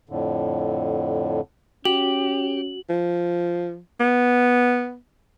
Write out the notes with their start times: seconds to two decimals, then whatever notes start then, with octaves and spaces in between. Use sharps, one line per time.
0.09 F2 A2 D3
1.85 C#4 F#4 G4 F#7
2.89 F3
4.00 B3